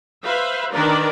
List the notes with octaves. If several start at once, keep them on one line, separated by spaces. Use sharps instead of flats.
B4 C5 E5 F5
D#3 D4 A#4 B4 D5